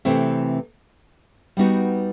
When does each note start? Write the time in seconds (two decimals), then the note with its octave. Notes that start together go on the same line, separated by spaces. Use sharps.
0.05 C3 E3 A3 C4
1.57 G3 B3 D#4 F#4